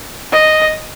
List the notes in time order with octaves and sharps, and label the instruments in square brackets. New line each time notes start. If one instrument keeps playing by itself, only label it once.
[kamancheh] D#5